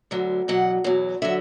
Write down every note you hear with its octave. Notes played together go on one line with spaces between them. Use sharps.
D2 D3 F#3
E2 B2 F#3 F#5
E2 B2 F#3
D3 F#3 E5